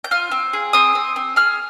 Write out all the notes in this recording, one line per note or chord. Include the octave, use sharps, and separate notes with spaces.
G6
F4 F6
C4
G#4
C4 D#6
C4
C4
G#4 F6